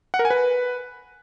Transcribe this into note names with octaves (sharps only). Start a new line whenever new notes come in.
F#5
A#4
G#5
B4